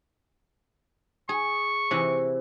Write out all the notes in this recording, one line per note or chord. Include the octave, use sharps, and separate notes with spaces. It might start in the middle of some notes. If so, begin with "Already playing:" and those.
G#4 C#6
C3 E3